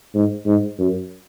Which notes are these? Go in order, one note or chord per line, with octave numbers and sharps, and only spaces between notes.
G#2
G#2
F#2